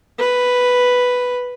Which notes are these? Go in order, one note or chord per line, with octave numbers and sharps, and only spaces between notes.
B4